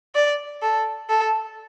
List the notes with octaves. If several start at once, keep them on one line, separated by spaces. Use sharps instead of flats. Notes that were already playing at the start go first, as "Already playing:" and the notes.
D5
A4
A4